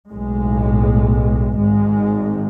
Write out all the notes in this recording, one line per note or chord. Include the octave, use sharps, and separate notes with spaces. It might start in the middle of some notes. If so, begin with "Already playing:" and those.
B1 A2 G#3
G#1 G#2 G#3